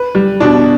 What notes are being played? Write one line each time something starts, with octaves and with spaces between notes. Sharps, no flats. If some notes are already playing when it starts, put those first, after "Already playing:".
Already playing: B4
G3
B2 D4